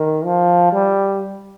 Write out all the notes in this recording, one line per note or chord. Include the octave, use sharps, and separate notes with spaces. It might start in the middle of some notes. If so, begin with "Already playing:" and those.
Already playing: D#3
F3
G3